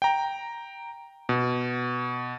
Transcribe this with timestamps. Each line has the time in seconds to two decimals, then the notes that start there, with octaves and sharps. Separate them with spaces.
0.02 G5 A#5
1.29 B2